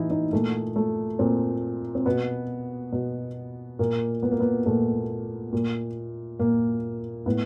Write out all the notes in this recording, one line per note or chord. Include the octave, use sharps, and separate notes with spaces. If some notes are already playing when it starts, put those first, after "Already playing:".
Already playing: A2 E3 D#4 E4
D#4
A#2 A3
A3
A#2 C4
C4
B2 B3
B2
A#2 A#3
B3
A#3
B3
A#2 A3
A#2
A#2 A#3
A2 B3